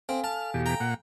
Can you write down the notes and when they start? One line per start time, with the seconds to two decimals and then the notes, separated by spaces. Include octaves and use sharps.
0.09 C4 A4 F5 G#5
0.24 A5 F6
0.54 E2 B2 G4
0.66 G5 A#5
0.80 A#2 F#5